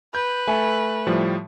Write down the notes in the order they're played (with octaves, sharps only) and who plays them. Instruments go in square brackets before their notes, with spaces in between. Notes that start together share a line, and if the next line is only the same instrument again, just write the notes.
[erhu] B4 [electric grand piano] G6
[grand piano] A3 G#5 [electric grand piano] A4
[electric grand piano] A2 F3 G3